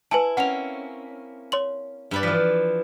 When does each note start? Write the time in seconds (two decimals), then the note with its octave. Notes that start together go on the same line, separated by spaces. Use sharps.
0.11 E4 B4 G#5 A5
0.37 A#3 C4 C#4 F#5 F7
1.52 C#5 C6 F#7
2.11 G2 B4 D5
2.23 E3 F3 B6